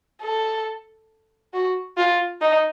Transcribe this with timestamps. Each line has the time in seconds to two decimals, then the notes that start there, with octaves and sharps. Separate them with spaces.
0.22 A4
1.54 F#4
1.98 F4
2.41 D#4